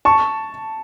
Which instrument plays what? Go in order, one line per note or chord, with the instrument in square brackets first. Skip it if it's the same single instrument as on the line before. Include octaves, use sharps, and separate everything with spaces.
[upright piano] A5 C#6